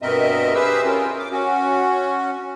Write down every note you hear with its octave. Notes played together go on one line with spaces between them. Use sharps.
G2 B2 C4 A#4 D#5 E5
G4 G#4 B4 C5 E5 E6
C#4 F4 A#4
D6
C#4 F#4